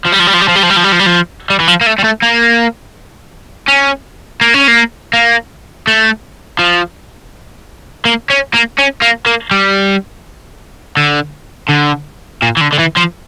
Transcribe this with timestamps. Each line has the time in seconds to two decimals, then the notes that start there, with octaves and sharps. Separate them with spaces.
0.05 F3
0.12 G3
0.19 F3
0.27 G3
0.33 F3
0.41 G3
0.48 F3
0.55 G3
0.63 F3
0.70 G3
0.76 F3
0.84 G3
0.92 F3
0.99 G3
1.06 F3
1.50 G3
1.60 E3
1.68 F3
1.81 A#3
1.87 A3
1.99 G3
2.04 A3
2.23 A#3
3.68 C#4
4.41 A#3
4.54 C#4
4.68 A#3
5.14 A#3
5.87 A3
6.59 F3
8.05 A#3
8.30 C#4
8.54 A#3
8.78 C#4
9.02 A#3
9.26 A#3
9.51 G3
10.97 D3
11.69 D3
12.42 A#2
12.57 E3
12.61 D3
12.72 D3
12.79 E3
12.97 F3